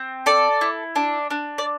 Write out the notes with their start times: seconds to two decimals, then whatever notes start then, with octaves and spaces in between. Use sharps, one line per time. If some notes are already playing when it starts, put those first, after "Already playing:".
Already playing: C4
0.26 A4 D5
0.61 E4
0.96 D4
1.31 D4
1.58 D5